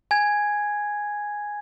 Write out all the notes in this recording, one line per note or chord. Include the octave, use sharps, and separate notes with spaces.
G#5 G#6